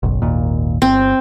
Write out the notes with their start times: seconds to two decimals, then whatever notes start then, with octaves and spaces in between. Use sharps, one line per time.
0.03 F#1 B1
0.22 G#1 D#2 A#2
0.82 G1 C4